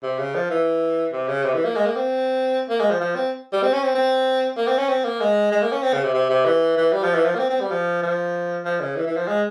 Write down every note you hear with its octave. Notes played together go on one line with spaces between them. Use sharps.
C3
C#3
F3
E3
C3
C#3
C3
E3
A#3
G#3
A#3
C4
A#3
G#3
F3
F3
C4
G3
C4
C#4
C4
C4
A#3
C4
C#4
C4
A#3
G#3
G#3
A#3
C#4
C4
C#3
C3
C3
C3
E3
E3
G3
F3
E3
F3
A#3
C4
C4
G3
F3
F3
F3
C#3
E3
E3
F3
G#3